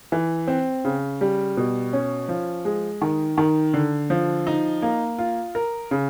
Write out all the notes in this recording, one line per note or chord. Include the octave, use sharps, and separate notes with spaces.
E3
C4
C#3
G3
B2
C#4
F3
G#3
D#3
D#3
D3
F3
D#4
A#3
F4
A#4
C#3